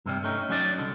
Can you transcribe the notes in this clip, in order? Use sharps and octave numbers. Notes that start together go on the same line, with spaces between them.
G2 C3 G3
A3 C#4 D#4
F#3 C#4 D#4 D5
C2 D3